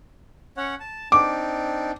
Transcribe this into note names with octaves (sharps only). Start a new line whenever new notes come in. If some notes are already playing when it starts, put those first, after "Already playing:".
C#4 C#5 F#5
A5
C4 D4 D#4 D6